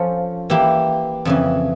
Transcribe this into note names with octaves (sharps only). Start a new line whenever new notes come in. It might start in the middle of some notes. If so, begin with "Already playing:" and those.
Already playing: F3 C#4 F4 A4
E3 A#3 E4 G4
F2 C#3 E3